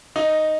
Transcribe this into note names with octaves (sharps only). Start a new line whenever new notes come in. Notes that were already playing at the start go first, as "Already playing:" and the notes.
D#4